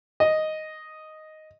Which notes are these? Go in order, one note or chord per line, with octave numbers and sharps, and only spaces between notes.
D#5